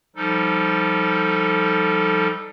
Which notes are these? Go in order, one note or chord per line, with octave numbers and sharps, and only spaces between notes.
F3 G3 D#4 A4